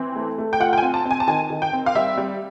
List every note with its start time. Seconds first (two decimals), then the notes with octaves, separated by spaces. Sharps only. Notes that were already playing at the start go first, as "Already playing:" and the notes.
Already playing: E3 C4
0.16 A3
0.38 A3
0.53 G5
0.60 F4 F#5
0.73 G5
0.78 G#5
0.82 C4
0.94 A5
1.06 C4
1.11 G#5
1.20 A5
1.28 D#3 G#5
1.50 D#3
1.62 G5
1.73 C4
1.86 F5
1.95 G3 E5
2.17 G3